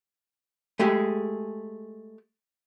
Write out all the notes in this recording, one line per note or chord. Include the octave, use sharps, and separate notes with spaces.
G#3 A3 G4 G#4